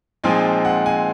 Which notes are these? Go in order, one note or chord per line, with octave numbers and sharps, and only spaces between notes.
A#2 F3 G#3 C4 D#4 G#5
F#5
G#5